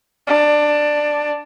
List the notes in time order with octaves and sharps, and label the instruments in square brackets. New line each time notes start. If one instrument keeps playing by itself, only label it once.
[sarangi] D4